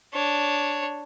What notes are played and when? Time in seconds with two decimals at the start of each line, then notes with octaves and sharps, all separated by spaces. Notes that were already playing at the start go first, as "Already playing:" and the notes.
0.14 D4 C#5